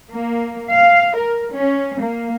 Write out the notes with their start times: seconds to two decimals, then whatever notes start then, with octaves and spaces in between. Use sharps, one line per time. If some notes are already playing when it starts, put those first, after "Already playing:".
0.11 A#3
0.71 F5
1.17 A#4
1.54 C#4
2.01 A#3